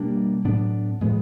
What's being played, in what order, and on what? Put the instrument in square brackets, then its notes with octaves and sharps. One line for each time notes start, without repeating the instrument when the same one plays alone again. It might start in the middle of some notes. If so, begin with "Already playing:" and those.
Already playing: [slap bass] B2 G3 A#3 D4
A2 F#3 B3 D4
A2 F3 G#3 B3